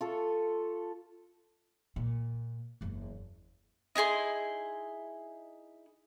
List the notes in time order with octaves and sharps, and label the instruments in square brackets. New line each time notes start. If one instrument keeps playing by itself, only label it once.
[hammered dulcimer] F4 A4 C#6
[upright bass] A#2
F#1 E2
[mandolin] D#4 E4 G#4 C6